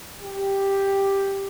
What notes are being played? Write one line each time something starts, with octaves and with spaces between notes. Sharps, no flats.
G4